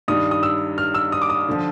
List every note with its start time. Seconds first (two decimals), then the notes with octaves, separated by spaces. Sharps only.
0.08 G2 D#3 G3 D#6
0.31 D#6
0.43 E6
0.78 F6
0.95 E6
1.12 D#6
1.22 D6
1.30 D#6
1.49 D3 F3